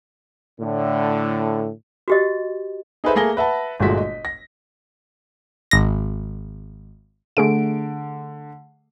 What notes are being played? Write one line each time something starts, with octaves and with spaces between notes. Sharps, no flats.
A2 D3
F#4 G4 D#5
D#4 G#4 A4 B4 C5 E5
A3 A#3 G#4 A#6 G7
B4 E5 F#5 A5
G1 A#2 G#3 A3 F#4 B6
D#5
A#6
G#1 A#6
D3 A3 G#4 D7